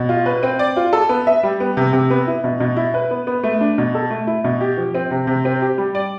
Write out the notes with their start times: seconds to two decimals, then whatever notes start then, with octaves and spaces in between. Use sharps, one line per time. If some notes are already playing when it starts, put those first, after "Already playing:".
Already playing: B2
0.09 F4
0.26 B4
0.43 C4
0.59 D5
0.76 F4
0.93 A4
1.09 B3
1.27 E5
1.43 G3
1.60 B3
1.77 C3
1.93 C3
2.10 B3
2.27 E4
2.44 B2
2.60 B2
2.77 E4
2.94 B4
3.11 B3
3.27 B3
3.43 A3
3.61 D4
3.78 B2
3.95 A4
4.10 A3
4.27 E4
4.44 B2
4.61 G4
4.77 F3
4.95 C4
5.11 C3
5.27 C3
5.45 C4
5.62 G4
5.78 G3
5.95 D5